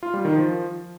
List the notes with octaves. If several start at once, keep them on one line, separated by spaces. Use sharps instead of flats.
F4
G3
D#3
F3